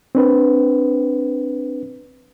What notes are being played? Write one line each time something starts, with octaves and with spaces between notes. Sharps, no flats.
C4 D4 B4